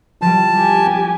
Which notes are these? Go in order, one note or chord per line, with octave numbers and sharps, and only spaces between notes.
F3 G3 A5
G4 G#5